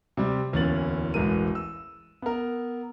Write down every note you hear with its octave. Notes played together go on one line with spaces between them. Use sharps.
C3 G3
D1 E2 A#3 C#4 A6 F#7
E1 A1 G#3 A#4 D#7
E6
B3 A#4